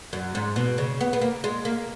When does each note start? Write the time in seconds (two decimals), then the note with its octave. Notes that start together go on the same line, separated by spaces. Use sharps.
0.13 F#2
0.35 G#2
0.56 B2
0.78 C#3
1.01 B3
1.13 B3
1.21 A#3
1.44 G#3
1.65 A#3